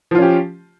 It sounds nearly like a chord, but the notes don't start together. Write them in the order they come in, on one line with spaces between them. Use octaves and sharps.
F3 F4 C#4 G4